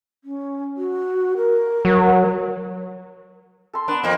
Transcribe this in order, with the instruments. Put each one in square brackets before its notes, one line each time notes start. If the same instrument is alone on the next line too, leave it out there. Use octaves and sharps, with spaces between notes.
[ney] C#4
F#4
A#4
[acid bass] F#3
[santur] A4 C6
[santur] B3 B4 A#5 [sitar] D4
[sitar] F2 A#3